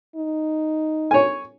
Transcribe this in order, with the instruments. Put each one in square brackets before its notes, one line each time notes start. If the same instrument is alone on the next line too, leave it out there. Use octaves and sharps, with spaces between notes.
[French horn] D#4
[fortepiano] C#5 G#5